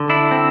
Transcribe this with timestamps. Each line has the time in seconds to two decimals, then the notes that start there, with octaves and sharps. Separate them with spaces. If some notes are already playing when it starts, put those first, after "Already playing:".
Already playing: D3
0.09 D4 E4
0.31 C4